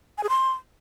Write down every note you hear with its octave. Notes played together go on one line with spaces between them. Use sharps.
G#5
G#4
C6